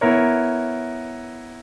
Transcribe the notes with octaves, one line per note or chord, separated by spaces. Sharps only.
B3 E4 A#4 C#5